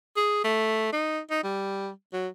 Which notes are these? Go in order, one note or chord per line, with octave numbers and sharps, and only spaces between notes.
G#4
A3
D#4
D#4
G3
F#3